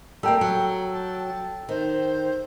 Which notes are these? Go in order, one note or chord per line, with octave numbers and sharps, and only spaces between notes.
G3 A#3 A4 G5 A#5
F#3
A5
D#3 C5